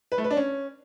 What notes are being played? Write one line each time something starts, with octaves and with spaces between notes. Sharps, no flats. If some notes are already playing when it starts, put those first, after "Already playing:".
B4
A3
B4
D4
C#4